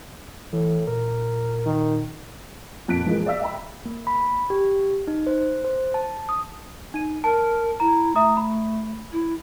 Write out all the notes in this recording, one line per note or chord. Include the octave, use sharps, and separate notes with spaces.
A2 E3
A#2 A#4
D#3
F2 A#2 F#6 B6 D7
E3 F3 G#3 A#3
D5 E5 F5 E6 B6
D#5 E5 G5 A#5 B5
A#3
B5
G4
D#4
C5
C5
A5
D#6
D#4 D#7
A#4 A5
E4 A#5
A3 E5 A#5 D#6
B5
E4